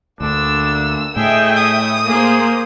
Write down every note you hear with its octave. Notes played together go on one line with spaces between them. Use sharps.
D2 D3 A#3 D4 E6
A2 A3 G#4 D#5 E5 G5
D#6
A#3 G#4 C5